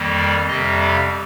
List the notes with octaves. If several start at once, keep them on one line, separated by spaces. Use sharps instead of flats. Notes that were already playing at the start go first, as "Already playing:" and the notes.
Already playing: F2 D#3 G3 A#3
D5
F2 C3 G3 D#5
F5